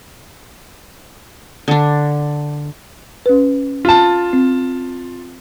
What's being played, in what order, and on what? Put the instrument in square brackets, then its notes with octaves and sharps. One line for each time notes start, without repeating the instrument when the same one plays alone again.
[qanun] D3 D4
[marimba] C#4 B4
[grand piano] F4 A5
[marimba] C4